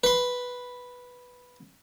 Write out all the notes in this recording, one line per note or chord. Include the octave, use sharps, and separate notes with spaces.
B4 C6